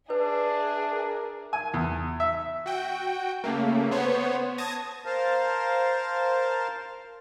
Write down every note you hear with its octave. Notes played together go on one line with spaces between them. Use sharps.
D4 G#4 B4 E5
A#4
G#5
E2
E5
F#4 G5
C#3 A3 A#3
B3 C5 C#5
A5 D#6 G#6 A#6
A#4 C5 F5 A5